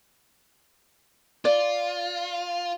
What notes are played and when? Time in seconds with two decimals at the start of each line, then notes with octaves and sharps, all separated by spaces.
1.45 F4 D5